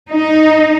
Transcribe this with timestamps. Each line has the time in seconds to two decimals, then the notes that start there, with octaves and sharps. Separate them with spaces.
0.11 D#4